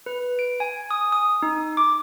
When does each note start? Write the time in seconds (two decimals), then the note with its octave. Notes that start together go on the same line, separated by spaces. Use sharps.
0.06 B4
0.39 D7
0.60 G#5
0.91 D#6
1.12 D#6
1.42 D#4
1.77 D6